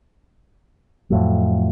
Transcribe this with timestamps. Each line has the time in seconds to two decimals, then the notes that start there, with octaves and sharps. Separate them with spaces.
1.10 F2 A2 F#3